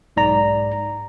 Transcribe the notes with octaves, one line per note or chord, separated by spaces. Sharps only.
B1 G#2 D5 A#5